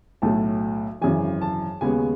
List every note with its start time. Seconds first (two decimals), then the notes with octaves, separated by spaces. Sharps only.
0.22 B1 A2 F#3 A3 A5
1.01 G#1 F#2 C#3 E3 G#5
1.42 A5
1.81 D#2 C#3 G#3 B3 G#5